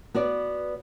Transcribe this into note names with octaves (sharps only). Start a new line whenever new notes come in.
B3 F#4 B4 D5